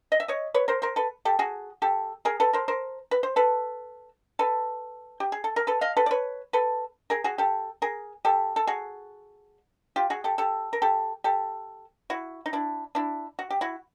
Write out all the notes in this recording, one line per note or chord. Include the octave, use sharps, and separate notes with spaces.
D#5
E5
C#5 D#5
B4 C#5
A#4 C5
A#4 C5
A4 B4
G4 A4
F#4 G#4
G4 A4
G#4 A#4
A4 B4
A#4 C5
A#4 C5
B4
C5
A4 B4
A4 B4
G4
G#4
A4
A#4
A4 B4
D#5 F5
A4 B4
D5
B4 C#5
A4 B4
G#4 A#4
F#4 G#4
G4 A4
G#4 A#4
G4 A4
A4
F#4 G#4
F4 G4
F#4 G#4
G4 A4
G4 A4
A#4
G4 A4
G4 A4
E4 F#4
D#4
D4 E4
D4 E4
F#4
G4
E4 F#4